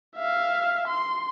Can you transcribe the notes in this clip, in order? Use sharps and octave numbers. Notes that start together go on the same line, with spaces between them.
E5 F5
C6